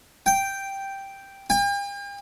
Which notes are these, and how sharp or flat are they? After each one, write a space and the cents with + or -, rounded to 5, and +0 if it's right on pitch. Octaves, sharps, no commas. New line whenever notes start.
G5 +0
G5 +45